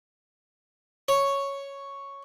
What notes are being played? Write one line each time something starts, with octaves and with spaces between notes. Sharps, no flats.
C#5